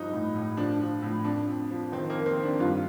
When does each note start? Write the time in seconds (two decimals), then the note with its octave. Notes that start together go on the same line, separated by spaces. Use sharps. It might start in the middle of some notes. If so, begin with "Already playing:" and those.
Already playing: G2 F3 D#4
0.13 A2
0.35 A2
0.57 F3 D4
0.80 F3
1.02 A2
1.24 F2 D4
1.47 F2
1.70 F3
1.92 D#3 C4
2.10 A#3
2.15 F2
2.26 C4
2.37 D#3
2.43 D4
2.59 G2 F4